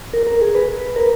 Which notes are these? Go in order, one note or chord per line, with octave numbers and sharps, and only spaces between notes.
A#4
A#4
G#4
B4
A#4